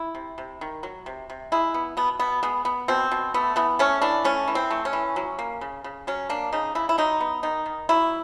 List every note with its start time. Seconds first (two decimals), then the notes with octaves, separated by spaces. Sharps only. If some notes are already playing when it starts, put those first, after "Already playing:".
Already playing: E4
0.15 C3
0.38 C3
0.61 D#3
0.83 F#3
1.06 C3
1.30 C3
1.52 G#3 E4
1.74 B3
1.97 B2 B3
2.19 B2 B3
2.43 G#3 B3
2.65 B3
2.88 B2 C4
3.11 B2
3.34 A3 B3
3.56 E3 B3
3.79 A3 C#4
4.02 E3 D4
4.24 A3 C#4
4.48 E3
4.55 C4
4.71 A3
4.85 C#4
4.93 E3
5.16 F#3
5.39 A#3
5.61 C#3
5.84 C#3
6.07 F#3 C#4
6.29 A#3 D4
6.53 C#3 D#4
6.75 C#3 E4
6.89 E4
6.98 F#3 D#4
7.20 B3
7.43 D#3 D#4
7.66 D#3
7.89 F#3 E4